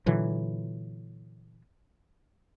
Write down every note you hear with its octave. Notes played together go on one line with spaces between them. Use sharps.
A#2 D3 E3 F#3